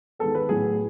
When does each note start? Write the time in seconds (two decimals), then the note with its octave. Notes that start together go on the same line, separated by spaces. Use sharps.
0.19 D#3 G#3 B3 A4
0.35 B4
0.49 A2 F#3 B3 G#4